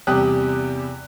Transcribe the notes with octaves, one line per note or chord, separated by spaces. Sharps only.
E2 C3 G3 G4 D#6 F#6